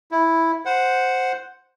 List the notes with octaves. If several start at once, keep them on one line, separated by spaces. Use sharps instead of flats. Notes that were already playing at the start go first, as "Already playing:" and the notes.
E4
C5 F#5